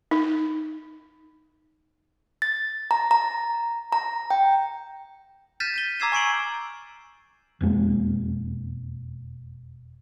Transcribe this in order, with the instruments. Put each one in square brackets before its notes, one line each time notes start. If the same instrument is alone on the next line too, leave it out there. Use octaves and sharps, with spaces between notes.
[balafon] D#4
[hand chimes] A6
A#5
A#5
A#5
G5
[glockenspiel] F6 G6 A6 B6 D#7 E7
A6 D#7 G7
A#5 D6 E6 G#6 C7 E7
G#5 C#6 E6 C7 D7 F#7
[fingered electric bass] E1 F2 G#3 A#3